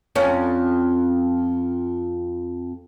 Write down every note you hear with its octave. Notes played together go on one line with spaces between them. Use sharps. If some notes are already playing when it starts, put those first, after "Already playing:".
F2 C#4